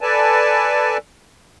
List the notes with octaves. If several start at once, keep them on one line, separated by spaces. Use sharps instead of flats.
A4 B4 D5 G#5 A5